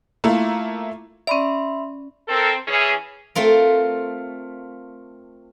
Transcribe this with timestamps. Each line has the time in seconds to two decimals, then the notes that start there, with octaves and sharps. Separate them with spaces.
0.24 A3 A#3 E4 F4
1.27 C#4 D5 E5 B5 C6
2.28 C4 A4 A#4
2.68 E3 C#4 G#4
3.35 A3 C4 F4 A#4